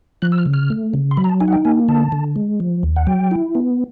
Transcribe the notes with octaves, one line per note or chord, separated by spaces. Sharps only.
F3 F#6
E6
F6
C#3
F6
A3
C#3
C6
F#3 B5
A#5
A5
D#4 G#5
F#5
G5
A#3 G#5
D3 A5
D3
G#3
F3
D#2
F#5
F#3 G5
E4
B3